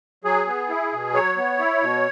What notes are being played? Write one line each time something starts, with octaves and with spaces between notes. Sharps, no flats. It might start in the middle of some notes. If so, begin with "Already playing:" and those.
F#3 G#4
B3
E4
B2
F#3 C#5
B3
E4
B2